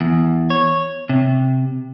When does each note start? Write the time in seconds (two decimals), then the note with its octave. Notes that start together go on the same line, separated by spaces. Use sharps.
0.01 E2
0.50 C#5
1.09 C3